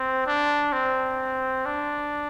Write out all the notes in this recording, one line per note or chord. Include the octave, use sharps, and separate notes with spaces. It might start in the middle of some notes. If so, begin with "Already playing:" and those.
Already playing: C4
D4
C4
D4